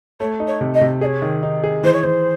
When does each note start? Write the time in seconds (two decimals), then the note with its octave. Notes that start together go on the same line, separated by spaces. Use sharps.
0.20 A3 C#5
0.40 D#4
0.47 C#5
0.61 C3
0.74 D#5
0.81 C3
1.01 G#4 C#5 D#5
1.22 D#3
1.43 D#4
1.64 G#4
1.83 E3 C5
1.93 C#5
2.03 E3 C5